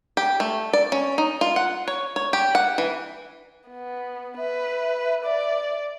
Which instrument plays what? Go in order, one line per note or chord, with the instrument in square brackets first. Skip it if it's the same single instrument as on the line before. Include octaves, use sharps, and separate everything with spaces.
[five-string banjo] G4
A3
D5
C#4
D#4
F4
F#5
C#5
C#5
G4
F#5
E3
[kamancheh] B3
[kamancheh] B4 [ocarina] E5
[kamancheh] D5